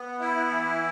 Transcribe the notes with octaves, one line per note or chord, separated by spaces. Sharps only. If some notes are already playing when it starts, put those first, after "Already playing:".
Already playing: B3
E4
E3